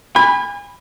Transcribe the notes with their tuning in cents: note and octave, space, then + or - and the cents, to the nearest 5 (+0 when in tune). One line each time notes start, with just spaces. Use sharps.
G#5 -35 B5 +0